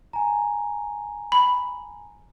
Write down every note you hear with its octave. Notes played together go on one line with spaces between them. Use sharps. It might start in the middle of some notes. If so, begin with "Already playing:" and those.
G#5 A#5
B5